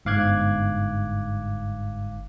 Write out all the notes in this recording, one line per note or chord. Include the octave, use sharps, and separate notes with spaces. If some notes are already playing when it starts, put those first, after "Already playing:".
G1 G#2 F5 D6 F#6 G#6